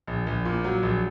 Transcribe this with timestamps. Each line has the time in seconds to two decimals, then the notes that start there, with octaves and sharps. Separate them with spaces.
0.08 A#1
0.27 A#1
0.45 A#2
0.64 F#3
0.83 A#1